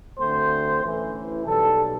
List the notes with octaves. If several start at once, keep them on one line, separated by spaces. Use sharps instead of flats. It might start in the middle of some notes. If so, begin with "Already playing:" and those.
D2 D3 A3 C4 C5
A1 A2 E3
B1 B2 G3 A4